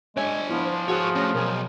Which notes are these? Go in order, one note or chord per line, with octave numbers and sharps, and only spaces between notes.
G#3 D4 C#5 E5 G#5
F3 B3 E4
C5
F#4 G#4 C#5 E5 F#5
A3 C#4 F#4
B1 A#4 G#5